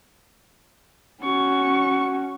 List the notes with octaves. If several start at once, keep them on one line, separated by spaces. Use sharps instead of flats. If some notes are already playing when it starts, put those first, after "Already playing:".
C#4 F#4 C#6